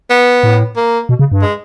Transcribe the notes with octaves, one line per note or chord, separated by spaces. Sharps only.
B3
A2
A#3
B2
C#3
G2
G#3